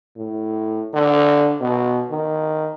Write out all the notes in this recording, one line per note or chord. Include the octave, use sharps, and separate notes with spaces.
A2
D3
B2
D#3